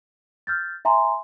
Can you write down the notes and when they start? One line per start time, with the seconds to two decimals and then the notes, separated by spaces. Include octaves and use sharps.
0.47 F6 G6 A6
0.85 E5 G#5 A#5 C6